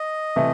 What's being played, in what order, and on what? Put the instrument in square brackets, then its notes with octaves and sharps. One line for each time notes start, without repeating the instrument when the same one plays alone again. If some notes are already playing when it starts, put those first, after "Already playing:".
Already playing: [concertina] D#5
[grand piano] C3 E3 A3